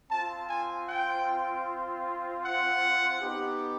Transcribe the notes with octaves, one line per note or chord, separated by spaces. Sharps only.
C4 F4 A5
G#5
G5
F#5
B3 D#4 G4